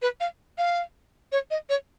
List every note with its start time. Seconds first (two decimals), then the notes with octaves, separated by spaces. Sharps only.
0.02 B4
0.20 F5
0.58 F5
1.32 C#5
1.51 D#5
1.69 C#5